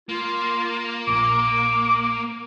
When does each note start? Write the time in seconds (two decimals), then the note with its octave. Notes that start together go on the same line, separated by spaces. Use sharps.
0.09 A#3 F4
1.07 A#1 A#2 D6